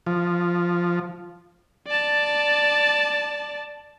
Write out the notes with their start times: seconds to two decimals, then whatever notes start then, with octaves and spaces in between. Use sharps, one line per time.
0.06 F3
1.87 D5 A5